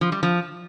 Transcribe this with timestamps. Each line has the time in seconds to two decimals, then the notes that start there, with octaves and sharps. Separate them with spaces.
0.01 F3
0.12 G3
0.23 F3